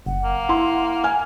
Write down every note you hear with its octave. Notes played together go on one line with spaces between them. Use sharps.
F#1 F#5
A#3
E4 C6
G#5 F6